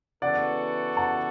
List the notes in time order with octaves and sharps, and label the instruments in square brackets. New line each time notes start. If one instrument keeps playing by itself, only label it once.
[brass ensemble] C#3 E3 B3 F#4 A4 [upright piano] D5 F#5
[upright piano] F#5 A5